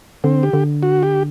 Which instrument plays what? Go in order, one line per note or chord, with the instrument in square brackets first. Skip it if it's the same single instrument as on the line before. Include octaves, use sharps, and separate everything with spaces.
[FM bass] D3 [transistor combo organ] C4
[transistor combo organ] G4
[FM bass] D3
[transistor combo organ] F#4
G4